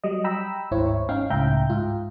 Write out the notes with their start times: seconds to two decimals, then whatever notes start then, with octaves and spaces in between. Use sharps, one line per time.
0.04 F#3 G3 D#5
0.24 G5 A#5 B5 E6
0.71 G#1 D2 G#2 E4 C5 C#5
1.09 C#4 D#4 F5 G5
1.30 C#2 A2 E5 G5 A#5 G6
1.70 G#2 F4